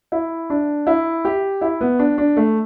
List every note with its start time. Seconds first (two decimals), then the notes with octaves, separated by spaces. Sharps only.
0.12 E4
0.50 D4
0.87 E4
1.25 G4
1.61 E4
1.81 B3
1.99 D4
2.18 D4
2.37 A3